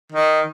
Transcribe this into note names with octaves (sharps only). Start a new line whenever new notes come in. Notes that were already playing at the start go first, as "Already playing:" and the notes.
D#3